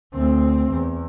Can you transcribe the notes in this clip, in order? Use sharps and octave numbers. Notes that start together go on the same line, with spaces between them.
D2 C4
E2